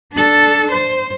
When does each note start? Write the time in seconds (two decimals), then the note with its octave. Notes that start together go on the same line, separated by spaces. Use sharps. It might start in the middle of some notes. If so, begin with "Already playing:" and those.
0.13 D4 A4
0.72 C5